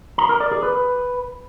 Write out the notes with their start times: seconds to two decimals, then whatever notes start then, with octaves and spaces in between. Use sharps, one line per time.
0.18 A#5
0.29 A#4
0.40 D5
0.52 G#4
0.63 B4